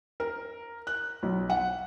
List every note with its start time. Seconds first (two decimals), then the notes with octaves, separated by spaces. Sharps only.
0.20 A#4
0.87 F#6
1.23 B1
1.50 F#5